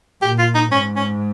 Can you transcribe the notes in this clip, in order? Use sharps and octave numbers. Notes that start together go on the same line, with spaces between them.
A#2 G4
F4
D#4
G#2 C#4
C#4